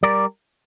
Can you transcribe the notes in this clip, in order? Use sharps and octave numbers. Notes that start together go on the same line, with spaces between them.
G3 A#4 D5